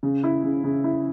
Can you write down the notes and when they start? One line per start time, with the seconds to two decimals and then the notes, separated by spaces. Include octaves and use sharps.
0.03 C#3
0.24 E4
0.44 C#3
0.64 C#3
0.84 E4